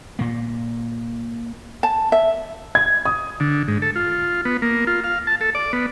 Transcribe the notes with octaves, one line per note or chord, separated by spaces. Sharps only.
A#2 A#3
A5
E5
G#6
D#6
D3
G#2
A4
F4
B3
A#3
F4
F5
A5
A4
D5
B3